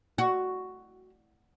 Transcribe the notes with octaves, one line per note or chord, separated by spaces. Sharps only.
F#4